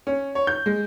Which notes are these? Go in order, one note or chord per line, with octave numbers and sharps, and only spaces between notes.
C#4
C#5
G6
G#3